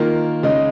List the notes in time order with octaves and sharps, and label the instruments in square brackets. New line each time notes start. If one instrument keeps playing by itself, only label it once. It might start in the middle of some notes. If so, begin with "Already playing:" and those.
Already playing: [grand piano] D#3 A#3 F4
C#3 G#3 D#4